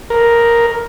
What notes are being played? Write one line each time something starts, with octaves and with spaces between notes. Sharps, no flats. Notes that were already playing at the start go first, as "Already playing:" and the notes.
A#4